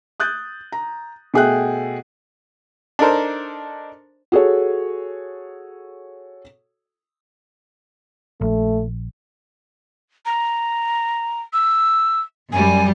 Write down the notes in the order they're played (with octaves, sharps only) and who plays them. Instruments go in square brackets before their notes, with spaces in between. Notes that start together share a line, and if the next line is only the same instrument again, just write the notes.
[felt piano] D#6 F#6 G6 A6
A#5
B2 A3 G#4 E5 G5 F#6
[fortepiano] D4 D#4 A4 A#4 C5
[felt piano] F#4 G#4 A4 C#5
[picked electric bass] A#1 [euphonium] A3
[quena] A#5
E6
[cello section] F#2 F#3 G3 [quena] G#5